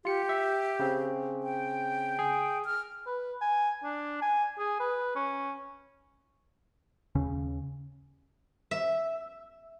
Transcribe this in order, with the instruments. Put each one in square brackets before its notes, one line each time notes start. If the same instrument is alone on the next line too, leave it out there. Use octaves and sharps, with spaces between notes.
[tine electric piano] F4 C#7 [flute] G4
[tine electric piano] E5
C#3 C4
[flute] G5
[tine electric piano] G#4
[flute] F6
[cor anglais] B4
G#5
D4
G#5
G#4
B4
C#4
[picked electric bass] D#2 C#3 C#4
[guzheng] E5